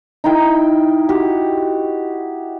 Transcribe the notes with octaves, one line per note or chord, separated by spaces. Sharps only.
D#4 E4 G5
F#4 G4